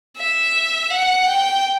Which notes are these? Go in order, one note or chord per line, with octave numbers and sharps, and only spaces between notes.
E5
F#5
G5